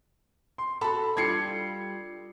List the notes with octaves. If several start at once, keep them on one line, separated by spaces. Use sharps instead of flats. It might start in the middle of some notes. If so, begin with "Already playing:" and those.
C6
F#4 A4 A5 B5
G3 D4 F4 G#6 C7 C#7